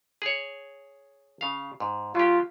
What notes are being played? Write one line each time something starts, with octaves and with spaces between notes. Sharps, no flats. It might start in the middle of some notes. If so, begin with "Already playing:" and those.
G#4 C#5
C#3 F5
G#2
F#3 F4 G4